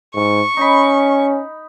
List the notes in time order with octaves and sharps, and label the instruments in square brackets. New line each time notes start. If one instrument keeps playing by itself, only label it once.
[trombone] G#2 [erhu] C#6
[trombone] C#4 [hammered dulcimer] D#4 B5